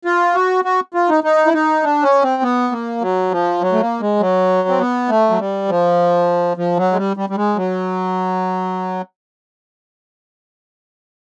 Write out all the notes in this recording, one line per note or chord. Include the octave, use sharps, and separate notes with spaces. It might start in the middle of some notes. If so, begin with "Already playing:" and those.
F4
F#4
F#4
F4
D#4
D#4
E4
D#4
D4
C#4
C4
B3
A#3
F#3
F3
F#3
A3
A#3
G#3
F#3
C4
B3
A3
F#3
G3
F3
F3
F#3
G#3
G3
G3
G3
G#3
F#3